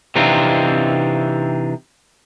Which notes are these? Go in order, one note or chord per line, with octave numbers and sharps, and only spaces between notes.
C3 E3 C4 D4 D#4 F4